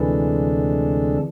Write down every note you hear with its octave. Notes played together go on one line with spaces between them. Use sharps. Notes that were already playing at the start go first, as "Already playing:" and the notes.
Already playing: D2 C3 E3 G#3 D4 A4